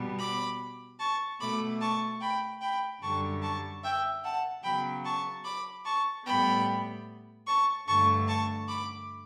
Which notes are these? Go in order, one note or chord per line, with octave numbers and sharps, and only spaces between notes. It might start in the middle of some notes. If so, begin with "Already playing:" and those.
Already playing: B2 G3 B3
B5 D6
A5 C#6
B2 A3 B5 D6
A5 C#6
G5 B5
G5 B5
F#2 D3 G3 A5 C#6
A5 C#6
E5 G5
F#5 A5
C#3 F#3 B3 G5 B5
A5 C#6
B5 D6
A5 C#6
A2 G3 B3 G5 B5
A5 C#6
G2 D3 A3 A5 C#6
A5 C#6
B5 D6